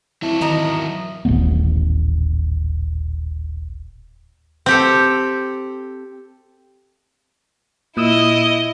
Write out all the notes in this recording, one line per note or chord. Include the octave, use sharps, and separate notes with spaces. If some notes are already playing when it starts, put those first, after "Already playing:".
F#3 C4 E4 E5 A5
D#3 E3 E4 D#5 A#5
D#1 A1 A3 B3
C4 G4 A4
A#2 E4 D#5 D#6 E6